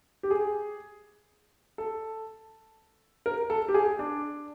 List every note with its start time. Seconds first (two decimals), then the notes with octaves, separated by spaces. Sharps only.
0.23 G4
0.31 G#4
1.78 A4
3.26 A#4
3.50 A4
3.69 G4
3.74 G#4
3.99 D4